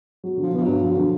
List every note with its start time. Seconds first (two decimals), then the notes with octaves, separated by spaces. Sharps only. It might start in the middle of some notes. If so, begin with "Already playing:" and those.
0.24 F#3
0.37 D3
0.43 F3
0.53 F3 B3
0.63 G2 F#3
0.82 F3 F#3
0.97 D3